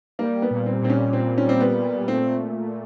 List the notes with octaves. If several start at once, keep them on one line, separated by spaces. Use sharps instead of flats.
G3 A#3
B3
A#2
C4
A#2 C4
C#4
A#2 C4
C#4
G3 C4
B3
A#2
A3 C4